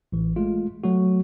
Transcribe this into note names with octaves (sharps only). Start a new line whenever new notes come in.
A1 E3
G#3 A3 F4
F#3 A3 F#4